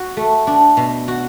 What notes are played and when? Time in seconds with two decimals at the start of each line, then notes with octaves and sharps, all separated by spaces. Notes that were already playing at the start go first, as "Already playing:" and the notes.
Already playing: F#4
0.17 A3
0.47 D4
0.77 B2
1.08 F#4